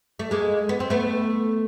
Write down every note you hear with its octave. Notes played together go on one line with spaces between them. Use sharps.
A3
G#3 A#3
B3
C4
A3 B3